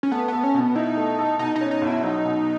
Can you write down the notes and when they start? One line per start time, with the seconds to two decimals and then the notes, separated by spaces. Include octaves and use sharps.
0.03 C#4
0.12 A3 B3
0.28 B3 A4
0.44 C#4
0.54 B2
0.60 B3
0.76 D#4 E4
0.97 A3
1.19 A4
1.39 B2 D#4
1.56 D#4
1.61 C#4
1.71 D#4
1.82 B1
1.87 E4
2.03 F#3 D#4
2.25 B2